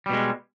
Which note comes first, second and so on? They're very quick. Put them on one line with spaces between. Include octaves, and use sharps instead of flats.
G3 B2 G#3